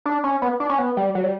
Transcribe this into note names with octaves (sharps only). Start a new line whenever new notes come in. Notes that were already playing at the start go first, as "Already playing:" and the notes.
D4
C#4
B3
D4
C#4
B3
G3
F#3
G3